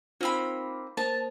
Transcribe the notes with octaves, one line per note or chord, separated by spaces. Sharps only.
A#3 C4 D#4 F4 C5 B5
A#3 A#4 C5 A5